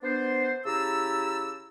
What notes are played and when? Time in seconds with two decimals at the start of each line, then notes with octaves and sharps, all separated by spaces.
0.02 B3 D4 C5
0.66 C#3 E4 G4 A5 A#5 E6